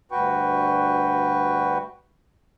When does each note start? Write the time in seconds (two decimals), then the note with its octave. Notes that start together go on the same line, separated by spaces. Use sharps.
0.12 D2 G2 F#4 B4 G5 C#6